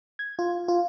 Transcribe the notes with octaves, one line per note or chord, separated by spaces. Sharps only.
G#6
F4
F4